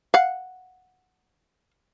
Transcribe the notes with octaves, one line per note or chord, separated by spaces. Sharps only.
F5 F#5